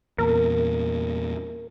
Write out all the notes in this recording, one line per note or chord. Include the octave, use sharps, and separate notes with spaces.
E2 A#2 A#4